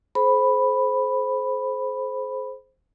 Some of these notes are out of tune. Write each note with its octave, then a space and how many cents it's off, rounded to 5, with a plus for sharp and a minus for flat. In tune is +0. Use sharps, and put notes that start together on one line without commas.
G#4 +45 C5 +0 B5 +0